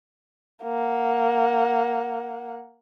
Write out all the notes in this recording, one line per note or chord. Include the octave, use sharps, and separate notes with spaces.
A#3 F#5